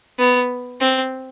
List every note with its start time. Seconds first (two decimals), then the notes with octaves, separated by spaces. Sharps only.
0.19 B3
0.81 C4